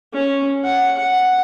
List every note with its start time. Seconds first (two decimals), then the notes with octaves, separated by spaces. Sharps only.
0.13 C#4
0.64 F#5
0.97 F#5